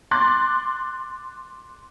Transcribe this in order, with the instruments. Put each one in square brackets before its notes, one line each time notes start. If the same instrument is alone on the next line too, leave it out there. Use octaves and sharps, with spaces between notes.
[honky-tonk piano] C6 D6 F#6 A6